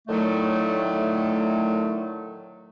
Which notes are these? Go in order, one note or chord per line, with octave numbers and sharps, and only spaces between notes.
A2 D3 D#3 F#3 A3